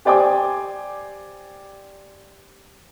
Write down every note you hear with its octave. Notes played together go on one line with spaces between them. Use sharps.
G4 C5 D5 G5 G#5 D6